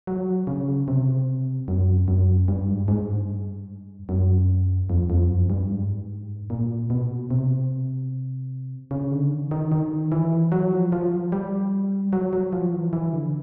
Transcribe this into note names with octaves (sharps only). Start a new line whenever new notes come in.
F#3
C#3
C3
F#2
F#2
G2
G#2
G#2
G2
F#2
F2
F2
F#2
G2
G#2
A#2
B2
C3
C#3
D3
D#3
D#3
D#3
E3
F#3
F3
F3
G3
F#3
F#3
F3
E3
E3
D3